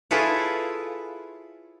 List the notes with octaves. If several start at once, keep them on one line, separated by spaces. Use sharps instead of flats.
E4 F4 G#4 A4 B4 C#5